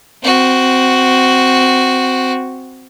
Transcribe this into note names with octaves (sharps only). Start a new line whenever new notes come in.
C4 F#4